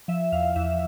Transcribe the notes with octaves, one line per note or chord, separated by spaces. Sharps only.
F3 E5
E2 F5
E2 E5